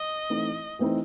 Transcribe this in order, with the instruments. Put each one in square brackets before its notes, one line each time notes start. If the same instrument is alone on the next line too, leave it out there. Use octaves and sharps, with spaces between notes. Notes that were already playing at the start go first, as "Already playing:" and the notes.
Already playing: [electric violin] D#5
[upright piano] E3 A3 C4 D#4
E3 A3 C4 D#4